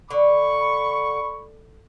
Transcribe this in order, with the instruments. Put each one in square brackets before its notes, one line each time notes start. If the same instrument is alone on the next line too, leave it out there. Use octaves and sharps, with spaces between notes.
[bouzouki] D3 [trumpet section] B5 C#6